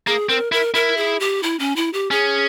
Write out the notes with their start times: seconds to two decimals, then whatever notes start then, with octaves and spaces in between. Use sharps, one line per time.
0.07 A#3 G#4
0.29 C4 A#4
0.52 E4 A#4
0.74 E4 A#4
0.97 G#4
1.20 G4
1.43 E4
1.59 C#4
1.76 E4
1.93 G4
2.11 C#4 G#4